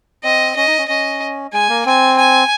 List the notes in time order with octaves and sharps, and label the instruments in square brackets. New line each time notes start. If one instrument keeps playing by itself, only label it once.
[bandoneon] C4 [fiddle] D#5
[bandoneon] C#4 [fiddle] D#5
[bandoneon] D#4
C#4
[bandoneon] C#4 [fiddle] D#5
[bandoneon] G#3 [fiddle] G#5
[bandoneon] A#3
[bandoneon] C4 [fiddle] G#5
[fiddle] G#5